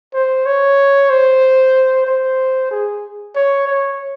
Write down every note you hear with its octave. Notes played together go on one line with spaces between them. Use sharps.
C5
C#5
C5
C5
G#4
C#5
C#5